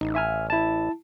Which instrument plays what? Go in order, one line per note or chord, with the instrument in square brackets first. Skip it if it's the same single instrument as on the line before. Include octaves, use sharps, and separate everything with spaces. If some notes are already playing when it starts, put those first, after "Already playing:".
[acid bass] A1 [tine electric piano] D#4
[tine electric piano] E5 G#5 F6
E4 A5